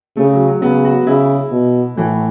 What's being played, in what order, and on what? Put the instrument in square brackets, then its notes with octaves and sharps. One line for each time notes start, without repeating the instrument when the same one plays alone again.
[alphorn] C#3 [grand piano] A3
[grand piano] F#3
F#3
[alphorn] C#3 [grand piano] B3
[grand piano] F#4
[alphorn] C#3 [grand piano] E4
[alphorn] B2
[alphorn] A2 [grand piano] E3